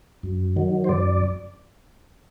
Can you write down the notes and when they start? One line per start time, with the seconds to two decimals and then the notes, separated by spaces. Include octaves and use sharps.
0.23 F#2
0.56 D#3 F#3
0.84 C5
0.89 F#2 D5